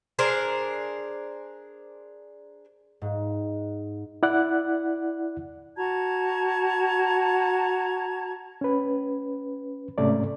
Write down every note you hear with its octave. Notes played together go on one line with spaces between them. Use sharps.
D4 G#4 A#4 C5
G#2
E4 D5 F#5 F#6
F#4 A5 A#5 G#6
C#4 B4
G#2 C3 A3 C#4 D5